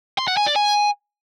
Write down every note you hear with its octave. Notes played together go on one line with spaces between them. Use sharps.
C6
F#5
G#5
D5
G#5